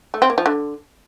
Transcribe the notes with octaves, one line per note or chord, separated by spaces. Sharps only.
A3
C4
A#3
F3
D3